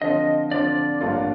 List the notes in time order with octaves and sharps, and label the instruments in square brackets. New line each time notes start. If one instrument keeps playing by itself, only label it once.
[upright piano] D3 F3 C4 [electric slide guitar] D#5
[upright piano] D3 F3 C4 [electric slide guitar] D5
[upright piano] A1 G2 F3 A#3 F4